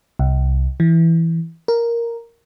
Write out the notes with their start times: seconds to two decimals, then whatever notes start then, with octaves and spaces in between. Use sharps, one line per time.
0.19 C2
0.80 E3
1.68 A#4